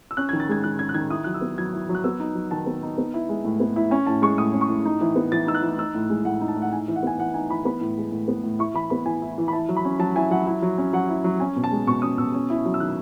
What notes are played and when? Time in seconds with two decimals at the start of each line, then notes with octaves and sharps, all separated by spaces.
0.11 E6
0.17 C#4 F#6
0.29 G#6
0.33 D#3
0.40 A6
0.49 G#3 G#6
0.64 D#3 F#6
0.79 C#4 G#6
0.89 F#6
0.94 D#3 G#6
1.10 E4 D#6
1.24 F#3 F#6
1.34 E6
1.41 B3
1.58 F#3 G#6
1.73 E4
1.89 F#3
1.95 F#6
2.04 B3 E6
2.20 D#4
2.35 F#3
2.51 D#3 A5
2.66 B3
2.83 D#4
2.98 B3
3.14 E4
3.29 G#3
3.45 A2
3.60 B3
3.76 E4
3.91 C#4 G#5
4.06 A2 A5
4.22 G#3 C#6
4.38 A2 D#6
4.53 C#4
4.61 C#6
4.69 A2
4.85 D#4
5.01 E3
5.16 B3
5.32 E3 A6
5.47 D#4 E6
5.55 F#6
5.62 E3
5.78 D#4 E6
5.95 A2
6.10 G#3
6.25 A2 F#5
6.41 D#4
6.48 A5
6.56 A2
6.62 F#5
6.72 D#4 G#5
6.88 E3
6.96 F#5
7.03 B3 G#5
7.18 E3 F#5
7.34 D#4 G#5
7.50 E3 B5
7.65 B3 B5
7.81 A2
7.98 G#3
8.12 A2
8.28 B3
8.43 A2
8.59 E4 C#6
8.74 E3 B5
8.90 B3 B5
9.06 E3 G#5
9.22 E4
9.38 E3
9.48 B5
9.53 E4 A5
9.69 F#3
9.77 B5
9.85 C#4
9.99 F#3 A5
10.16 E4 G#5
10.31 F#3 F#5
10.47 E4
10.62 F#3
10.78 C#4
10.93 F#3 F#5
11.09 E4
11.24 F#3
11.40 C#4 G#5
11.56 B2
11.64 A5
11.72 G#3
11.87 B2 C#6
12.02 C#4 D#6
12.18 B2 E6
12.34 C#4
12.50 E4
12.66 F#3
12.74 E6
12.80 D#3 F#6